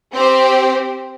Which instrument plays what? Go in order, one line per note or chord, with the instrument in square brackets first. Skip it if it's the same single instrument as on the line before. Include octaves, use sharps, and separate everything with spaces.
[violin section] C4 G4 C5